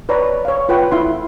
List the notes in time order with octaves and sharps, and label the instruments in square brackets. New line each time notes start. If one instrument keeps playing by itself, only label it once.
[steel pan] B4 C#5 D5 A#5
C#5 F5
F4 B4 F#5 G5
E4 F4 F#5 C6